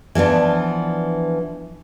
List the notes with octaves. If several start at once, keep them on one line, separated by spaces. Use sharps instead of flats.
E3 F3 B3 D4